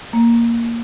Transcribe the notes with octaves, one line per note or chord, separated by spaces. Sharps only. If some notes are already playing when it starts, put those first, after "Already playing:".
A#3